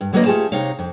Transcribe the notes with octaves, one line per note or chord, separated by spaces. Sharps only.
G2
D3 F#3 A#3 F#4 B4 D#5
A3 C#4 F4 G4 G#4 A5
C3 D#4 C#5 F5
F2